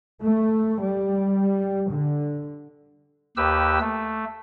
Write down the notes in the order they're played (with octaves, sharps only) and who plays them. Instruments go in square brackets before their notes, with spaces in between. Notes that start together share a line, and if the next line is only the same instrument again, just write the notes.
[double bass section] A3
G3
D3
[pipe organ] D#2 G4 B4 E6
A3